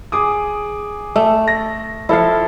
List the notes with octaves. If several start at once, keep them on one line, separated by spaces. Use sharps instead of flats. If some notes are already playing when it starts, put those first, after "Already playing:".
G#4 D6 D#6
A3
A#6
F3 E4 A4 F5